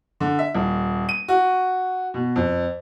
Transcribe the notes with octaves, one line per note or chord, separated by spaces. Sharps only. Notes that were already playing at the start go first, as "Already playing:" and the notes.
D3
E5
D#1
D#7
F#4
B2
F2